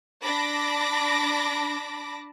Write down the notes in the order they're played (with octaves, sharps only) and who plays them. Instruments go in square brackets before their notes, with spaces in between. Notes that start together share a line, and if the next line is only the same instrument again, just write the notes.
[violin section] D4 A5 B5 D6 A#6